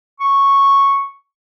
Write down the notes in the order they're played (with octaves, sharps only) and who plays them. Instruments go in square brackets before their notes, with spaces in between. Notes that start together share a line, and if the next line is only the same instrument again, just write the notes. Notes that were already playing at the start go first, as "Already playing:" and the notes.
[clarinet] C#6